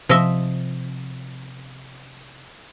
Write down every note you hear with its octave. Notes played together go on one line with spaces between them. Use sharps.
C3 F3 D#5 E5